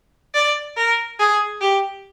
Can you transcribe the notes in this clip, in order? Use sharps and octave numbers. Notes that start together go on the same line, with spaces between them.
D5
A#4
G#4
G4